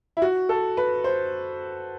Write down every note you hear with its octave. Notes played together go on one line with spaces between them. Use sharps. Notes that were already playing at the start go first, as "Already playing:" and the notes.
E4
F#4
A4
B4
C5